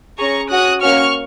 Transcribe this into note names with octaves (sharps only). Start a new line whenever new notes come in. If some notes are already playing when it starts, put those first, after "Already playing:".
C#4 G#4 A#5 C#6
C#4 F#4 D#6 F#6
A#3 C#4 F#4 C#6 F6